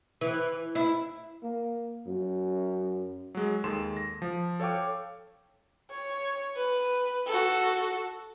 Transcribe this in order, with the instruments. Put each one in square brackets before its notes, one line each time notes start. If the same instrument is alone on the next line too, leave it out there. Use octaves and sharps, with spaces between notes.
[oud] E3
E4
[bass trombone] A#3
F#2
[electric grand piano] F#3 G#3
D#2 G#3 A4 C6 E7
A#6
F3
A4 C#5 F5 G5 D6
[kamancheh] C#5
B4
F#4 A4